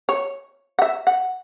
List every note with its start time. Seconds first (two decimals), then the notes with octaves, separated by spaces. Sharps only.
0.09 C#5
0.79 F#5
0.82 E5
1.07 F#5